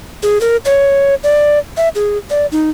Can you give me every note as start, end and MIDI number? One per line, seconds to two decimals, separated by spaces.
0.23 0.38 68
0.41 0.57 70
0.65 1.15 73
1.24 1.59 74
1.77 1.89 76
1.95 2.18 68
2.30 2.46 74
2.52 2.70 63